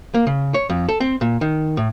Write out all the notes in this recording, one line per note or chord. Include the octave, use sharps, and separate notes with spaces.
A#3
C#3
C#5
F2
A4
C4
A#2
D#3
A2